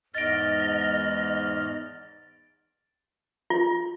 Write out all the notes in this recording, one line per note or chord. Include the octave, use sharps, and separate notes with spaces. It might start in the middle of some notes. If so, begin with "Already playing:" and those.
E2 G#2 D#5 F6 A6 D7
F4